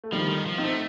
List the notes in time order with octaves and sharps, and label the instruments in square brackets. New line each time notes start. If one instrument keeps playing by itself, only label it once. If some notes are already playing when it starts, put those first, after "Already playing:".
[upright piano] A3
[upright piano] D#3 G3 [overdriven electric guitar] F3
[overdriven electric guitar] D#3
F3
[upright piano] C4 D#4
[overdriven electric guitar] A3